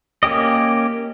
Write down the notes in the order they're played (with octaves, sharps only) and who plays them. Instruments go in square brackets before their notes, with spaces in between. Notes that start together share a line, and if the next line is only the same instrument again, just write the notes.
[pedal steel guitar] A#3 C#4 G4 D#5